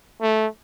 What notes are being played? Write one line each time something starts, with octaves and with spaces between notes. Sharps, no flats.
A3